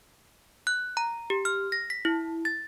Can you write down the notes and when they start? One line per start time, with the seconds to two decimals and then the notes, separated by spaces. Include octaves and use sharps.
0.67 F#6
0.97 A#5
1.30 G4
1.45 F6
1.72 A#6
1.90 B6
2.05 E4
2.45 A6